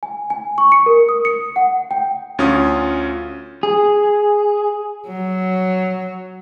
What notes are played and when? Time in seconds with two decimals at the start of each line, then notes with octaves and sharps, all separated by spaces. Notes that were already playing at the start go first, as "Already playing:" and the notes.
0.03 G#5
0.30 G#5
0.58 C#6
0.72 C#7
0.86 A#4
1.09 D#6
1.25 C#7
1.56 F#5
1.91 G5
2.39 D2 C#4 F4 D#6
3.63 G#4
5.08 F#3